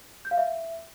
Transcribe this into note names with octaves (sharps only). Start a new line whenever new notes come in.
G6
F5
E5